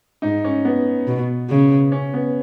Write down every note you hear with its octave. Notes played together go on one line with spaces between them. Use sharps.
G#2 D#4
C#4
B3
B2
C#3
C#4
B3